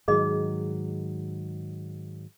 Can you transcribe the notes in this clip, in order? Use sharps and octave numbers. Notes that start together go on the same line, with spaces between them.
G#2 D#3 F#3 G#4 D#5